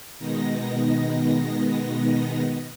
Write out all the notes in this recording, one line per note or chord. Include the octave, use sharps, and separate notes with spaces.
B2 D#3 G#3 B3 D#4 A#6